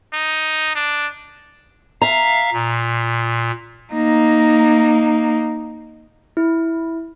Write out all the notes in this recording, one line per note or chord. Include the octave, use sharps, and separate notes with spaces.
D#4
D4
E5 F5 A#5
A#2
A#3 D#4
E4